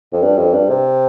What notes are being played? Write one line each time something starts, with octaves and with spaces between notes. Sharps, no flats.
F2
G2
F2
G2
C3